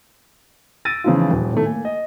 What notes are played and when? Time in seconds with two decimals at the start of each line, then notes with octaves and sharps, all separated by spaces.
0.85 E6 A6 A#6 D7 D#7
1.04 C#3 E3 F3 D#4 F4
1.30 D#1
1.53 A2 D#3 A3
1.66 A#3 G#5
1.85 D#5